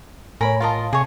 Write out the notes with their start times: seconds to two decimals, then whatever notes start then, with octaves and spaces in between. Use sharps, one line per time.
0.41 A2 A#4 C#5 G#5 B5
0.60 F4 A#4 D#5 F5 A5
0.93 C3 G#4 C#5